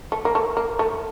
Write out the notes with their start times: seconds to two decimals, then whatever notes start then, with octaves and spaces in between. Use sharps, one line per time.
0.12 A3
0.25 A#3
0.35 A3
0.57 A#3
0.79 A3